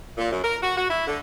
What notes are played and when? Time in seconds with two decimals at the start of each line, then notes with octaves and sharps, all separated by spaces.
0.17 A#2
0.32 F#2
0.44 A#4
0.63 F#4
0.77 F#4
0.90 E4
1.07 D3